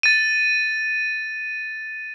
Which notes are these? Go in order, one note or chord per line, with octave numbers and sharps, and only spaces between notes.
A6 D#7